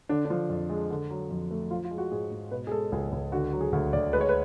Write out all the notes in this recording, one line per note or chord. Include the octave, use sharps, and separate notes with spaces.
D3 D4
F3 D4
F2
G#3
D3
F#3
F2
A3
F3 F4
F4
G#3
F#4
G#2 G#4
G#2
B2 B4
G#4
G#3 A4
C#2 G#4
C#2
D3 F#4
F#3
G#4
D2 F#4
D2 D5
G#3 B4
C#5
B4